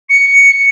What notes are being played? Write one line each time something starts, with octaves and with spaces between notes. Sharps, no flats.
C#7